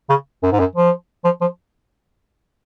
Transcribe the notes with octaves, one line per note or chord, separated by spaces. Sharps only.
C#3
F#2
G#2
F#2
F3
F3
F3